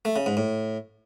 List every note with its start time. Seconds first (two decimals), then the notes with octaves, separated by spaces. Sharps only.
0.05 A3
0.16 C#3
0.26 G#2
0.37 A2